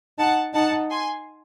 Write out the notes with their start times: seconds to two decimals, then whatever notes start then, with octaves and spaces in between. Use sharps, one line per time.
0.18 D#4 F#5 A5
0.54 D#4 F#5 A5
0.90 G#5 C6